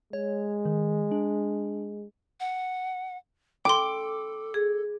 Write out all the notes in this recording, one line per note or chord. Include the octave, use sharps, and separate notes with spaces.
G#3 C#5
D#3
D4
F#5
A4 G5 C6 D6
G#4